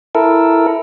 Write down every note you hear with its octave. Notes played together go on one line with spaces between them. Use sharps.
E4 A4 A#4